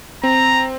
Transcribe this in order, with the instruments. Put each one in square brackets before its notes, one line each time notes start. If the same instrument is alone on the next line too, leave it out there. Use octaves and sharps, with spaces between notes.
[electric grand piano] C4 [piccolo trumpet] A#5